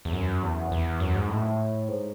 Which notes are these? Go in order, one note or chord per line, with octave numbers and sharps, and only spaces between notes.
E2
F#2
E2
E2
F#2
G#2
A2
G#2